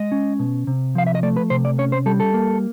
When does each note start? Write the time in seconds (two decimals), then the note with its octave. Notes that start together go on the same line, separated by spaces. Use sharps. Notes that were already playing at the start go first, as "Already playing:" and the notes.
Already playing: G#3 D#5
0.12 C#4
0.39 B2
0.67 C3
0.95 F3 F5
1.07 E5
1.15 D#5
1.23 A3 D5
1.37 B4
1.50 C3 C5
1.65 D5
1.78 C#4 C#5
1.92 C5
2.06 G3 A4
2.20 A4
2.34 A#3